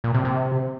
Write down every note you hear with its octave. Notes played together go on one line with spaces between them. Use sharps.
A#2
C3
C3